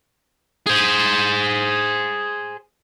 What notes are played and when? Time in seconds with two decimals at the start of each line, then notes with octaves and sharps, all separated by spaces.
0.67 G#4 C5